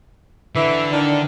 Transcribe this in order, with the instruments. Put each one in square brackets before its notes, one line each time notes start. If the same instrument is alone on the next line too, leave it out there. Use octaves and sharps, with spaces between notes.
[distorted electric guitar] D3 [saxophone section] E3 E5
[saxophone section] D#3 D4